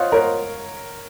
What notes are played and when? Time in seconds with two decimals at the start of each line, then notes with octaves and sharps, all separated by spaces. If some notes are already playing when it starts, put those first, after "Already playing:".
Already playing: F4 C5 C#5 D#5 F5 F#5
0.12 A#4 C#5